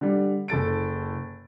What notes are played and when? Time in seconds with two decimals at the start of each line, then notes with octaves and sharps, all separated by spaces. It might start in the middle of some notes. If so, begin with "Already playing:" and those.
0.01 D3 G3
0.48 F#1 A4 A6 D7